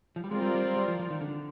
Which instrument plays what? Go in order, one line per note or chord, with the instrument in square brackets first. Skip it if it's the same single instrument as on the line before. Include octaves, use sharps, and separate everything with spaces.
[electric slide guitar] F3
G3
[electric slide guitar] G#3 [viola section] C4 F4 A#4 D5
[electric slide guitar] G3
G3
G3
G3
F3
F3
D#3
D3